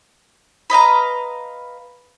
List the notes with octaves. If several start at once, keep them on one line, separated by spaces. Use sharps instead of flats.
B4 D#5 F5 A#5